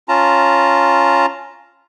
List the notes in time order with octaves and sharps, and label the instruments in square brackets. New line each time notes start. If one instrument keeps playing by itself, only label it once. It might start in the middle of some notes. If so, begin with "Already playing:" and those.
[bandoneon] C#4 F4 A5 A#5